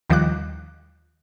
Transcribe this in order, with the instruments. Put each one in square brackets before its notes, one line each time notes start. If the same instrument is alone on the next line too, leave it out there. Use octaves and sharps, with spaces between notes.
[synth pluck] D#2 D#3 F3 G3 D6 F#6